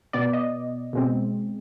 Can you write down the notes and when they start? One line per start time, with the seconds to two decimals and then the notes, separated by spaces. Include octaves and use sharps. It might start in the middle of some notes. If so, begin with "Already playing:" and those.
0.13 B2 B3 D5
0.33 D#5
0.93 B2 G#3 C4